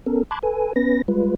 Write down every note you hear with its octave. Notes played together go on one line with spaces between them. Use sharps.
B3 C#4 A4 A#4
A5 B5 C6 D6 F#6 G#6
A4 B4 G#5
B3 C#4 B4 A#6
G3 G#3 F4 B4